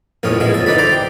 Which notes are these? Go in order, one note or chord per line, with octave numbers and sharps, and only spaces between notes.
A#1 F2 A2 C#4 D#6
G#3 B3 E4
F2 A4
E3 D#4 B4 D5 B5
C5 D5 A#5 B5 D6
G4